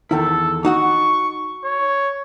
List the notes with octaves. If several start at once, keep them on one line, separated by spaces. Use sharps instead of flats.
E2 D#3 E4 A4
D#4 F#4 F#5 C#6
C#5